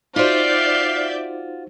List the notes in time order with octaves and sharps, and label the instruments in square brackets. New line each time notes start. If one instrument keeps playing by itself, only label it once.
[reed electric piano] D#4 C5 [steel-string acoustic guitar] F4 F#4 [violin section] D5 E5 G6 [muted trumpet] F5